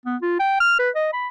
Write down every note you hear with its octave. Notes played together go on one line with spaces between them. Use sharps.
B3
F4
G5
F6
B4
D#5
B5